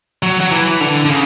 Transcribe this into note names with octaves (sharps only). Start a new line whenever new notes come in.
F#3
F#3
E3
D3
D3
C#3